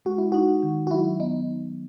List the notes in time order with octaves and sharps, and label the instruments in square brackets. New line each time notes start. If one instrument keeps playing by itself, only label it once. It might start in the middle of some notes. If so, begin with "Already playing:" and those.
[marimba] G#3 [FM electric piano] F#4
[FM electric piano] E4
[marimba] D#4 [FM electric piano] F#4
[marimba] D#3
[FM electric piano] F#4
[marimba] F#3 [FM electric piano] E4
[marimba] B3 [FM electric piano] D#4